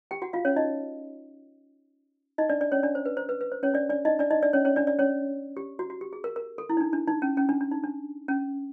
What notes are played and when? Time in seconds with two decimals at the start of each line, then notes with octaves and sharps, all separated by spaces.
0.11 G4 G5
0.22 F#4 F#5
0.33 F4 F5
0.45 C#4 C#5
0.56 D#4 D#5
2.38 D#4 D#5
2.49 D4 D5
2.61 D4 D5
2.72 C#4 C#5
2.83 D4 D5
2.95 C5
3.05 B4
3.17 C5
3.29 B4
3.41 B4
3.52 C5
3.63 C#4 C#5
3.74 D4 D5
3.90 D4 D5
4.05 D#4 D#5
4.19 D4 D5
4.30 D#4 D#5
4.43 D4 D5
4.53 C#4 C#5
4.65 C#4 C#5
4.76 D4 D5
4.87 D4 D5
4.99 C#4 C#5
5.57 G4
5.79 F#4
5.90 F#4
6.01 G4
6.13 G#4
6.24 A#4
6.36 A#4
6.58 A4
6.69 E4
6.77 D#4
6.81 D4
6.93 D4
7.08 D#4
7.22 C#4
7.37 C#4
7.49 D4
7.61 D4
7.71 D#4
7.84 D4
8.28 C#4